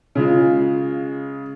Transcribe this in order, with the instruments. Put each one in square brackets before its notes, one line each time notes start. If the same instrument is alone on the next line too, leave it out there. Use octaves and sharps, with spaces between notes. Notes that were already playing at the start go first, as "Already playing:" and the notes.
[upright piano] C#3 G#3 F4